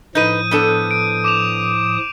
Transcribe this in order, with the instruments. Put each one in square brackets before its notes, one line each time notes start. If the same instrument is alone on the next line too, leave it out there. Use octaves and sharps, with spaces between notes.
[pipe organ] A2 F3 D#6 [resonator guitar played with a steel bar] D#4 B4 [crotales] G6 D#7
[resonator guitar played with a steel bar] B3 D4 A4
[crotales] D7
D6 E7 F7